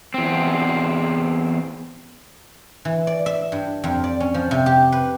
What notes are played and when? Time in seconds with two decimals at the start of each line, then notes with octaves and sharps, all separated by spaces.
0.14 E2 C4
2.85 E3
3.07 D5
3.26 E5
3.52 G2
3.84 F2
4.04 D5
4.20 C#4
4.34 F3
4.51 C3
4.66 G4
4.92 B4